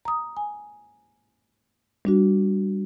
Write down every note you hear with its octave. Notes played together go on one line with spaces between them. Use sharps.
A#5 D#6
G#5
G3 D4 F#4